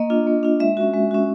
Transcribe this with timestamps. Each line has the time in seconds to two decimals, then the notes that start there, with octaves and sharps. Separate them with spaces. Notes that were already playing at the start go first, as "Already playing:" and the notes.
Already playing: A#3 D#5
0.10 D4 F4
0.27 A#3
0.43 D4 F4
0.60 G#3 E5
0.77 C#4 F#4
0.94 G#3
1.11 C#4 F#4